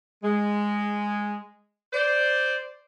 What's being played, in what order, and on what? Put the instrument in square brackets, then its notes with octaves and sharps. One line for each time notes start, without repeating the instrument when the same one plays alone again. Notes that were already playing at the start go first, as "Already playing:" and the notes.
[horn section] G#3
C5 D5